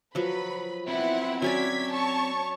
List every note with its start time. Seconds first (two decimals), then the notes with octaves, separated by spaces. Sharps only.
0.15 F3 F#3 B4 B5
0.88 B3 C4 E4 F#5 B5
1.42 F#3 C#4 D5 G#6 B6
1.91 C#5 A5 C#6